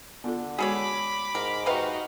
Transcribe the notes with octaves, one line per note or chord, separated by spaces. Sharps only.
D3 B3 F4 A4
G#3 F#4 G#4 A4 C#5 B5 D6
G#2 A#4
C3 D#4 F#4 B4 F5